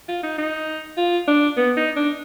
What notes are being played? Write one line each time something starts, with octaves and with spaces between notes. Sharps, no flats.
F4
D#4
D#4
F4
D4
B3
D#4
D4